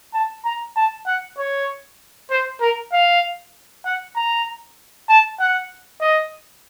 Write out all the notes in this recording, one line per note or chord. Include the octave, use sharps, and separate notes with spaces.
A5
A#5
A5
F#5
C#5
C5
A#4
F5
F#5
A#5
A5
F#5
D#5